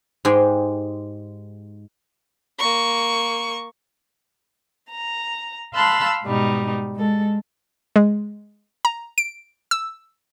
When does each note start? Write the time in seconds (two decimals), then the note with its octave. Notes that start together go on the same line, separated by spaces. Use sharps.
0.25 G#2 G#3 G4 G#4 G5
2.59 A#3 C#6
4.91 A#5
5.75 F5 A5 B5 C6 E6 F#6
6.24 G#2 B2 G3 D#4
6.96 G#3 A4
7.96 G#3
8.85 A#5
9.18 D7
9.71 E6